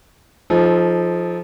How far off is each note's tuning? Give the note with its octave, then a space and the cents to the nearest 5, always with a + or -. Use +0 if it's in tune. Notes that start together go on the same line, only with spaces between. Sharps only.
F3 +0 D#4 +0 A4 -30